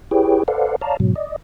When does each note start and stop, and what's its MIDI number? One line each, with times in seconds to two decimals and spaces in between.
0.11 0.43 64
0.11 0.43 67
0.11 0.43 68
0.11 0.43 71
0.11 0.43 73
0.11 0.43 79
0.48 0.76 69
0.48 0.76 71
0.48 0.76 72
0.48 0.76 74
0.48 0.76 77
0.48 0.76 78
0.81 0.97 73
0.81 0.97 74
0.81 0.97 77
0.81 0.97 81
0.81 0.97 82
1.00 1.14 44
1.00 1.14 47
1.00 1.14 54
1.16 1.36 74
1.16 1.36 75